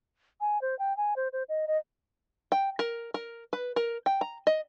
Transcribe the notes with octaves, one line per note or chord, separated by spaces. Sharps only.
G#5
C5
G5
G#5
C5
C5
D#5
D#5
G5
A#4
A#4
B4
A#4
G5
A#5
D#5